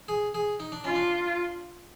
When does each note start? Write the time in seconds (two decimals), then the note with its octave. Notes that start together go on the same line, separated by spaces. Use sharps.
0.08 G#4
0.35 G#4
0.60 D#4
0.72 D4
0.84 C#4 F4
0.95 D4